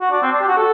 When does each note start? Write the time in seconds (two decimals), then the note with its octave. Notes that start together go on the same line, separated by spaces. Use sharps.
0.01 F#4
0.11 D4
0.22 C4
0.32 D4
0.41 G4
0.48 F#4
0.57 A4